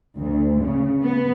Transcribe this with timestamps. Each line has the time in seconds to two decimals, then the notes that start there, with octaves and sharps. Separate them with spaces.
0.17 D2
0.61 C#3
1.03 B3